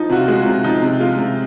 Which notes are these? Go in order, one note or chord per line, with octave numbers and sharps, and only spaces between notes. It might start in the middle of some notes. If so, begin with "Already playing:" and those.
Already playing: F3 D#4
C3 F#4
F4
G#3 F#4
F4
C3
F3 D#4
C3
G#3 F4
C3